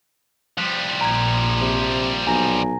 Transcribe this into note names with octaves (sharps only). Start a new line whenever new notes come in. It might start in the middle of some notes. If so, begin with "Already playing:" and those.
F3 G3 F#6 B6
A#1 A#2 A#5 G#6
C3
B1 G#5 A#5 A#6